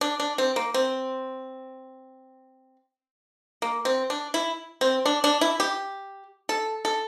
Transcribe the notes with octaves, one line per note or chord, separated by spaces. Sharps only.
D4
D4
C4
A#3
C4
A#3
C4
D4
E4
C4
D4
D4
E4
G4
A4
A4